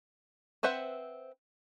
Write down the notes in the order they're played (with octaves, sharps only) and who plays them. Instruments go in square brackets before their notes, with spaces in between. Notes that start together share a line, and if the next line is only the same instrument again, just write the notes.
[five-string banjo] C4 B4 C5 E5 F#5